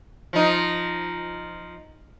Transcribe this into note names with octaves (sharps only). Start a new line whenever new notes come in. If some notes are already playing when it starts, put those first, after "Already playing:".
F3 D#4